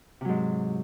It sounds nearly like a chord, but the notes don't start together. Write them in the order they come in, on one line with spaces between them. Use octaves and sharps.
C3 F#3 G#2